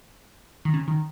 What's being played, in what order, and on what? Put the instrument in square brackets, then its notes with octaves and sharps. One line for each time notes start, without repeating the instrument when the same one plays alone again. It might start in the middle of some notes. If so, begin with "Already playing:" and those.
[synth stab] D#3
C#3
D#3